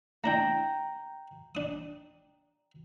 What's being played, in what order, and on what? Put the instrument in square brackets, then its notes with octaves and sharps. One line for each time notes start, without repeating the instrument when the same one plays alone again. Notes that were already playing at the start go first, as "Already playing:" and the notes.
[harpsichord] A3 D4 E4 [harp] G5 A#5
[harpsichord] D4 D#6